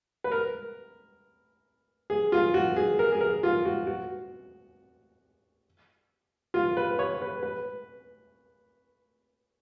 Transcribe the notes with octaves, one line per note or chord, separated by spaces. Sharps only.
B4
A#4
G#4
F4
F#4
G#4
A#4
G#4
A#4
F4
F#4
F#4
F4
B4
C#5
B4
B4